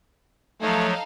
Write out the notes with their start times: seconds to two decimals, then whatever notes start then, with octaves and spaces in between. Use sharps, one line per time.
0.62 F3 F#3 A3 D#4 A4 C#5 F5